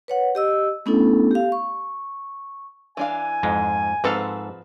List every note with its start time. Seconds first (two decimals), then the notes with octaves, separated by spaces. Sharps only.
0.08 B4 C#5 F#5
0.35 G4 D#5 E6
0.86 A3 B3 C#4 D4 E4 A4
1.31 G4 F5
1.52 C#6
2.97 E3 D4 F5 G#5
3.43 F2 G#2 G#3
4.04 G#2 F3 C4 A4 B4 F5